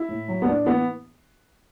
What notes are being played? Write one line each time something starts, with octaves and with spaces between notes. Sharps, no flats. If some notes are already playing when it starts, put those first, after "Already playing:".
Already playing: E4
A2
F#3
B3
A2 D4
E3 B3